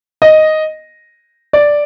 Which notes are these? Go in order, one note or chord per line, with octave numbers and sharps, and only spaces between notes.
D#5
D5